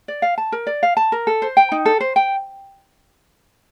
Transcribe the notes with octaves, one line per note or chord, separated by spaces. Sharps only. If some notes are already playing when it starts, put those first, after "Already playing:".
D5
F5
A5
A#4
D5
F5
A5
A#4
A4
C5
G5
D#4
A4
C5
G5